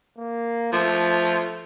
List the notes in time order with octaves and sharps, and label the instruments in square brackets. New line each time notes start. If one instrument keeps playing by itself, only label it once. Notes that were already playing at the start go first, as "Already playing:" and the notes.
[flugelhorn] A#3
[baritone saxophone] F3 [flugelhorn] A3